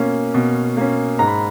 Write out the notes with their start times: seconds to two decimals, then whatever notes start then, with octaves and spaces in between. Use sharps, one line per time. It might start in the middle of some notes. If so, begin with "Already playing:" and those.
Already playing: B2 A#3 C#4
0.34 B2
0.77 A#3 C#4
1.19 G#2 A#5
1.27 B5